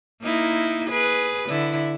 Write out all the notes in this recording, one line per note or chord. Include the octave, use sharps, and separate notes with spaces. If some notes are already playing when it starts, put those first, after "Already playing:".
A#3 D#4 E4
G#4 B4
D3 E4